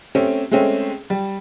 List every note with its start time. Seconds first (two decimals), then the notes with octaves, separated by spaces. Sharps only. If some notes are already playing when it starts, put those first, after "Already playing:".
0.15 A3 C4 C#4 G4
0.51 G#3 A3 C4 C#4
1.10 G3